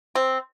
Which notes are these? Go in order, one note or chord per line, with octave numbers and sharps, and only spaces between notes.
C4